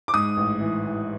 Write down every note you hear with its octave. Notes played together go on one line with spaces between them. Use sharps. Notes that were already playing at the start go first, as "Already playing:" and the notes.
D6
G#2 D#6
A1
E3
E3